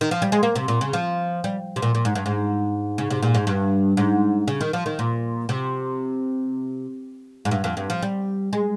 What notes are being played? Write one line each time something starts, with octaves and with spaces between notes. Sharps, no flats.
D#3
F3
G3
G#3
A#3
C3
A#2
C#3
F3
G3
C3
A#2
A#2
G#2
G2
G#2
C#3
C3
A#2
G#2
G2
G#2
C#3
D#3
F3
D#3
A#2
C3
G#2
G2
F2
G2
F3
G3
G#3